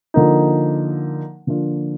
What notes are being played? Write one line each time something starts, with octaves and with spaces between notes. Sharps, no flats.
D3 F3 A#3 D#4
D3 F3 A#3 D4 F4